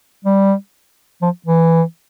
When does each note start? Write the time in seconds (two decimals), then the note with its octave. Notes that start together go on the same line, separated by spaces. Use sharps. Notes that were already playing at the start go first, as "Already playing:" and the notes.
0.25 G3
1.22 F3
1.46 E3